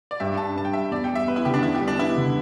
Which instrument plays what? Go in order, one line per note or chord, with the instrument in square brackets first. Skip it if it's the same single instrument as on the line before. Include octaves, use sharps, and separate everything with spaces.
[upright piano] D5
[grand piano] G2 [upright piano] E5
[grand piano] D4 [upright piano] A5
[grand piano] G2 [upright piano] A5
[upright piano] G5
[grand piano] G3 [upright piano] E5
[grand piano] E2 [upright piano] D5
[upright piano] G5
[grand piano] G3
[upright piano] E5
[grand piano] B3 [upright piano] B4
[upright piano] E4
[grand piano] D3 [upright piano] G4
[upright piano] D4
[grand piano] E2 [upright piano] E4
[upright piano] G4
[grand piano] G3
[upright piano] D4
[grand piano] B3 [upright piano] E4
[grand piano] D3